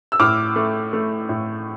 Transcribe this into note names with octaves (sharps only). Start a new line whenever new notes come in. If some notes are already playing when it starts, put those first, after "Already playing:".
E6
A2 D6 F6
A3
A3
A2